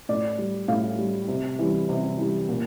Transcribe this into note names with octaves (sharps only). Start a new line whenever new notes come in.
A2 D5
G3
A2 F5
G3
C3
E3 G3
C3
E3 G3
A#2